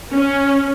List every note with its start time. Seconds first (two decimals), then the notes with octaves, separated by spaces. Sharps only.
0.14 C#4